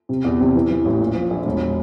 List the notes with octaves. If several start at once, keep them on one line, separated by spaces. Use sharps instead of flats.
C3
E2
C3
E3
E3
A1
A#2
F3
A#1
E1